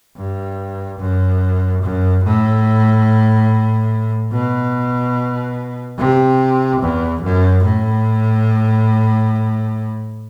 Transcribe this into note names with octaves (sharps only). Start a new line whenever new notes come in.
G2
F#2
F#2
A2
B2
C3
E2
F#2
A2